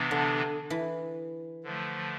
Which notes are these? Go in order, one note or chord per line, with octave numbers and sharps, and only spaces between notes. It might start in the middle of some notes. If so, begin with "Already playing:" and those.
Already playing: C3 E3 B3 D4
D3
E3
D3 F3 A3